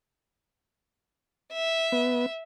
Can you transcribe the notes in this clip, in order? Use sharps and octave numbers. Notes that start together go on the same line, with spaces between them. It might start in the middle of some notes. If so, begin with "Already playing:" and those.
E5
B3